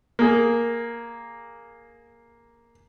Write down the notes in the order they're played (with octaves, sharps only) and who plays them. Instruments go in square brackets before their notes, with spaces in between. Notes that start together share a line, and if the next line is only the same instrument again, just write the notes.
[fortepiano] A#3 G#4